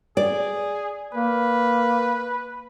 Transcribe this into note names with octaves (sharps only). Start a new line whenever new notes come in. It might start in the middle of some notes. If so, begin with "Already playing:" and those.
G#4 D5
A#3 B4